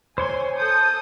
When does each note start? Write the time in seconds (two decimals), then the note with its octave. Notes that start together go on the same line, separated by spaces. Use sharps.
0.18 C5 C#5 G#5 C6
0.58 A4 D#6 G6